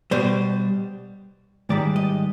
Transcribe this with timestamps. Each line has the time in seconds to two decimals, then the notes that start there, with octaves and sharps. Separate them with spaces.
0.11 B2 G3 C5
1.69 G#2 D#3 G3 D5
1.96 D#5